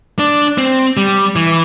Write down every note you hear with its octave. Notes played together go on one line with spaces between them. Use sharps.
D4
C4
G3
E3